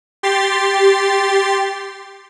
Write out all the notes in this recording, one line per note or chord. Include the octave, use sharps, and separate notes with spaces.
G4 C6 A6